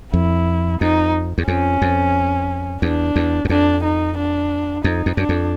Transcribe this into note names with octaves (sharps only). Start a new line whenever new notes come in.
F2 E4
F2 D#4
E2
F2 C#4
F2
E2 D4
E2
F#2
F2 D4
D#4
D4
F2 D#4
F2
F#2 D4
F2